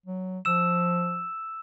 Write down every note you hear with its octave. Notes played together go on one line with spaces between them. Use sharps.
F#3
F3 E6 E7